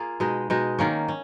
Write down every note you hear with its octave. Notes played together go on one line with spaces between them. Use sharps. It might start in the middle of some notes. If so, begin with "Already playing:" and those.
Already playing: A#3 F4 G#4
B2 G#3 D#4
B2 G#3 D#4
D#3 A#3 C#4
C#4